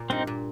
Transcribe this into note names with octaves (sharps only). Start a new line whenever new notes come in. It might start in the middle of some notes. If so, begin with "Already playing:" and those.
Already playing: A#2
G2 C4 D#4
A#2